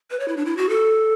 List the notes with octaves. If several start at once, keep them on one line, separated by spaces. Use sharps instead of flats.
B4
C#5
E4
D4
E4
F#4
A4